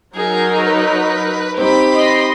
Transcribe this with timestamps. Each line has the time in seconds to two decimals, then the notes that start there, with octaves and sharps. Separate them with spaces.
0.15 F#3 D#4 G#4 A#4
0.63 B4
1.58 C4 D#4 G4 B5
1.94 D#5 C6